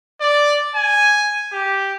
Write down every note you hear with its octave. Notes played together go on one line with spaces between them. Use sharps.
D5
G#5
G4